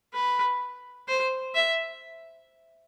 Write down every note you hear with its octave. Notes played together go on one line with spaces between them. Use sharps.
B4
C5
E5